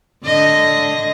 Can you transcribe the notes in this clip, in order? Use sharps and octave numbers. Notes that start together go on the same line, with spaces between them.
D3 D#5